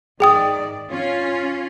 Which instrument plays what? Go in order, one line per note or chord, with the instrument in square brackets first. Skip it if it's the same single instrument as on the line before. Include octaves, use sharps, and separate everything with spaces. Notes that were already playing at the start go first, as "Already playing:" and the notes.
[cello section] G#2 D#3 D5 [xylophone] G#4 G5 D#6
[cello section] C#4 F4